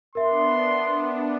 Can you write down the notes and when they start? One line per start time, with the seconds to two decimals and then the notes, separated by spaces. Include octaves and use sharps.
0.15 B3 D4 A#4 E5 C6